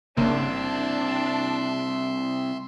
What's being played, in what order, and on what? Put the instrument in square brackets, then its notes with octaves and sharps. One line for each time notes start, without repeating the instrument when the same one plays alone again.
[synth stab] G1 C#3 A#3 [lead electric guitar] C2 [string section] D4 [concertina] E5 C6